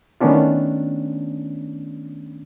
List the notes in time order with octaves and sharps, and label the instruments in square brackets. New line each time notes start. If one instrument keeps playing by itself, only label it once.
[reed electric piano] D#3 A3 B3 C#4 D4 F4